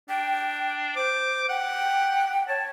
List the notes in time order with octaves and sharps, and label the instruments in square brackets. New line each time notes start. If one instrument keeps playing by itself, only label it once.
[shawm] D4 [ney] G5
[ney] C5 [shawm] D6
[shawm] F#5 [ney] G5
[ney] C#5 [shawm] A5